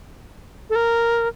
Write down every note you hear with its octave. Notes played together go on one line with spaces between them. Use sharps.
A4
A#4